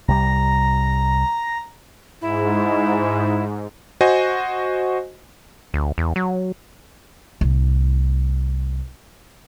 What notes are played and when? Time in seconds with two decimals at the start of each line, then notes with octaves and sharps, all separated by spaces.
0.08 C2 G3 A#5
2.21 G#2 E4
4.01 F#4 C5 D#5 G#5
5.74 D2
5.98 E2
6.16 F#3
7.41 C2 A2